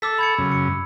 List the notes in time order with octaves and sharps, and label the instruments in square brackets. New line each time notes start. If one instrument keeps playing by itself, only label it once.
[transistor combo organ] A4 [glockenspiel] D6 E6 B6
[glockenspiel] B5 G#6 C#7
[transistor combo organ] F#2 C#3
[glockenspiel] C#7